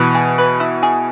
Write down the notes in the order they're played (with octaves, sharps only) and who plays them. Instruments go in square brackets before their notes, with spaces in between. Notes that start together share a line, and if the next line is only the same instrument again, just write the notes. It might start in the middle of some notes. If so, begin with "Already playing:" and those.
Already playing: [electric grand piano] B2 E3 [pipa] B4
[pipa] G#4
B4
E4
G#4